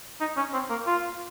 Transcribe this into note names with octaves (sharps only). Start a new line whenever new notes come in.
D#4
C#4
C4
A#3
F4